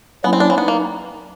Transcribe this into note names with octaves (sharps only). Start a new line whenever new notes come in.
F#3 A#3 B3 C#4 E4
C4
D4
C4
B3 D#4
A#3